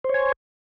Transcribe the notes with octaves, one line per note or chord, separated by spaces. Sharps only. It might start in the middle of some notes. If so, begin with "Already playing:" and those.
C5 C#5 G#5